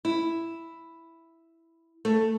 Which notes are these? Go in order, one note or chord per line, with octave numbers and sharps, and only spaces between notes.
E4
A3